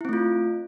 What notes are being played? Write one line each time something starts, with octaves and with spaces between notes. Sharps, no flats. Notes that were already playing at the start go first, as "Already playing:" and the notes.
A3 C4 E4 F4